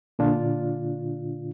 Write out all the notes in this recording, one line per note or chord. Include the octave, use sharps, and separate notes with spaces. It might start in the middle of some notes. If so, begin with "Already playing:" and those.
A#2 D3 D4 F4